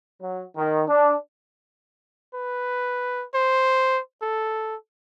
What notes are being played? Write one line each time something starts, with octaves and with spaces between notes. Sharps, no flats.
F#3
D#3
D4
B4
C5
A4